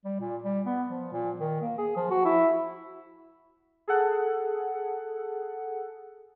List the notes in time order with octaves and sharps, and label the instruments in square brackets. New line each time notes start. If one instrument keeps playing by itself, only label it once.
[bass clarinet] G3
A#2
G3
B3
F3
A#2
D#3
A#3
G#4
F3
F#4
E4
[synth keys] G#4 A4 F#5